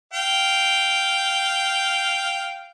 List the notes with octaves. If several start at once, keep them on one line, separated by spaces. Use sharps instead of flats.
F5 G5